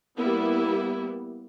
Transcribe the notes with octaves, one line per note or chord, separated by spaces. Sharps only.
G3 A#3 B3 E4